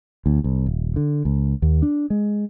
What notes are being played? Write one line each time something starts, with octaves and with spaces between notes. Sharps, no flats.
D2
C2
D#1
D3
C#2
D#2
D4
G#3